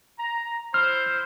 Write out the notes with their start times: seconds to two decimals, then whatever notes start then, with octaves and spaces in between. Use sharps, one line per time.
0.19 A#5
0.74 E4 C5 F6